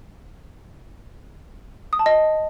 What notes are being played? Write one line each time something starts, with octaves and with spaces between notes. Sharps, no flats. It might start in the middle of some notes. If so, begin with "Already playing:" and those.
D#6
A5
D#5